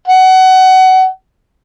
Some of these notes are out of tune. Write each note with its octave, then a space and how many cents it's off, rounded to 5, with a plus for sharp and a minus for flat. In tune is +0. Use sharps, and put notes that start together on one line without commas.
F#5 +25